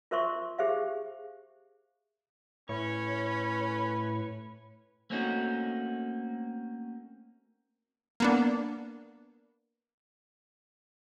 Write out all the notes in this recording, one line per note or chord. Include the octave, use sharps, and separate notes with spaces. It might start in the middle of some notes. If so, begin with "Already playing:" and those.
F4 A#4 C5 E5 C6 C#6
G4 G#4 C5 E5 F5
A2 C#4 B4 C#5
A3 A#3 C4 C#4 D#4 F#4
A#3 B3 D4